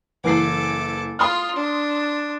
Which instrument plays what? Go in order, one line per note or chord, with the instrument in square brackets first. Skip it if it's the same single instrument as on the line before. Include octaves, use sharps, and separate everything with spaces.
[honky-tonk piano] F#1 E3 C7 [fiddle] A4 D6
[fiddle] F4 [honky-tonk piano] C6 D#6 F6
[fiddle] D4